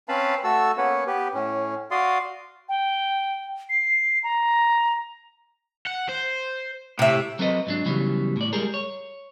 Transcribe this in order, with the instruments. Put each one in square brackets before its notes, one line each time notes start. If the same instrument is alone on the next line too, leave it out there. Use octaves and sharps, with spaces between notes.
[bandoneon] C4 C#4 B4 F5 A5 B5
A3 F#4 A4 A5 E6
A#3 B3 C#4 B4 C#5 F#5
B3 G4 B4
A2 C#4
F#4 D5 F5 C6 D#6
[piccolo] G5
C7
A#5
[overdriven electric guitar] F#5
C5
[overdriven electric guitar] A2 [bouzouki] C3 E5
[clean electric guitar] F#3 C4 A4 B4 D#5
G#2 F#3 D4
C#3 E3 F#3 G3 B3
A2 D5
G3 G#3 G#4 A#4
C#5